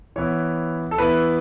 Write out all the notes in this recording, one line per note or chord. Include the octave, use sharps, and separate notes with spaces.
E3 B3 E4 C#5
A4
E3 B3 E4 B4